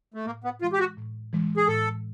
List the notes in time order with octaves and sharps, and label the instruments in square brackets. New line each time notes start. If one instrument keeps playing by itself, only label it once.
[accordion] A3
[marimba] A2 [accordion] A#3
[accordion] B3
[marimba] E3 G#3 [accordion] F4
[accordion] G4
F#4
[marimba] A2
E3 G#3
[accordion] G#4
[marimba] A2 [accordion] A4